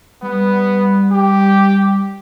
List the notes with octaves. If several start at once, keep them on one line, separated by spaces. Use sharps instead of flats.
G3 B3
G4